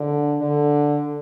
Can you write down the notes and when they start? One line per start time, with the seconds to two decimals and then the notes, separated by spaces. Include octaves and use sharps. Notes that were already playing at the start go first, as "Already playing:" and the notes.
Already playing: D3
0.41 D3